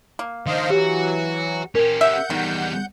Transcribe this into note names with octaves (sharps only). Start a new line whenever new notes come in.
A#3
D#3 D4 C5 D#5 F5
E3 F#3 F#4 G4
C#4 G4 A#4
E5 F#5 G6
E2 D#3 G3